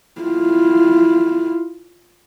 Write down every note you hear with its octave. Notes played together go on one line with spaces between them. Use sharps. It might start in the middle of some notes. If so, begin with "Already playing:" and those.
E4 F4